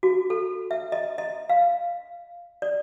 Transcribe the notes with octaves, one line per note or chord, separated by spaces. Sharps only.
F#4
A4
E5
D#5
D#5
F5
D5